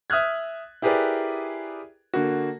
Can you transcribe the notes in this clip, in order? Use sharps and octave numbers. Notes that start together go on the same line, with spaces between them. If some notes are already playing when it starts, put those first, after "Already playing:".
E5 D#6 F6 F#6 G#6
E4 G4 G#4 A#4 B4 D5
D3 A#3 F#4